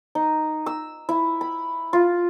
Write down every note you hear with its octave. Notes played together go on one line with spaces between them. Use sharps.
D#4
E6
E4
B5
F4